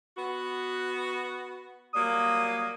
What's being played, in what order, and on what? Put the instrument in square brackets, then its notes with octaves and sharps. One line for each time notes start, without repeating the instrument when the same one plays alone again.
[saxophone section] B3 F#4
[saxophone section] F#3 G3 A#3 [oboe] D#6